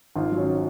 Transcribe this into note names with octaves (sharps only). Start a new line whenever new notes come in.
G#1 F4
F#3
C#4